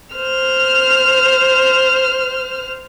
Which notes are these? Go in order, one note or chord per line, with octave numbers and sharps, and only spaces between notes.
C5 F6